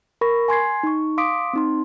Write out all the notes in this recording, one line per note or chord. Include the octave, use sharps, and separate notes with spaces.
A#4 B5 C#6 A#6
G#5 C6 G#6 C7
D#4 C#6
F5 C6 D6 D#6 B6 D7
C4 D#4 C6